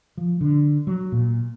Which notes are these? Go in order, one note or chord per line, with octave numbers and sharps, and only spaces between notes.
F3
D3
F#3
A#2